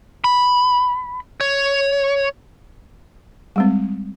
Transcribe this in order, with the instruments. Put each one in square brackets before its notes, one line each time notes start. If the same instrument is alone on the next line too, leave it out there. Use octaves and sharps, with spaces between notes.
[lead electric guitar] B5
C#5
[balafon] G3 G#3 C4